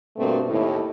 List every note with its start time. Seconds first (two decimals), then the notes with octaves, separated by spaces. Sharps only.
0.16 G2 B2 A3 A#3 C4
0.48 D#2 A2